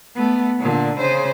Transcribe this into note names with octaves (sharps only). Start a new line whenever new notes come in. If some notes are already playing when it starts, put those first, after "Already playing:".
A3 B3
A#2 D3
C#3 C5